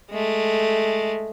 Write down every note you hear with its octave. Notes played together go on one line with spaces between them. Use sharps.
G#3 A3